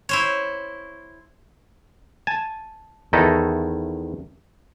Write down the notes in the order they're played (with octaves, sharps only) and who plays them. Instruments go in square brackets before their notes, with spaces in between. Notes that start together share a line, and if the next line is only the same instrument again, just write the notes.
[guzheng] E4 C5 C#5
[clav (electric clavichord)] G#5 A5
E2 D#3 D#4 E4 A4